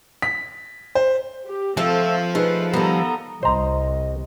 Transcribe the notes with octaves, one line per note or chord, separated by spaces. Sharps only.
B6
C5
G4
F3 A3 C4 F4 A4
A3 D#4 G#4 B4
D#3 G3 B3 A4 A#5
C2 C5 D#5 A#5